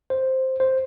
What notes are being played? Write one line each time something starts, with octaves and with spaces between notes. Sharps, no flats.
C5
C5